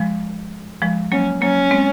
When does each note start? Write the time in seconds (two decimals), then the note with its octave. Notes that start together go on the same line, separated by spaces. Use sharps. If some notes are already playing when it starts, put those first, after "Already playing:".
Already playing: F3 G#3
0.82 F3 G#3
1.12 F#3 A#3 C#4
1.42 F#3 A#3 C#4
1.71 G#3 C4